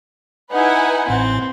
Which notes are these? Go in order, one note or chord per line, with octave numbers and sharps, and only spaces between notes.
D#4 E4 B4 F#5 G#5
A1 A2 C4